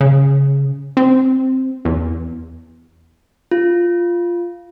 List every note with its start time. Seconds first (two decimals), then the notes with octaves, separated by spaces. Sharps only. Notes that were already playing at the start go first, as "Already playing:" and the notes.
0.01 C#3
0.97 C4
1.85 E2
3.51 F4